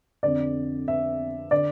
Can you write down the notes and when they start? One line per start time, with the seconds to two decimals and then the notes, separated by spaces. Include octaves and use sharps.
0.23 F2 D3 D5
0.88 E5
1.51 D3 D5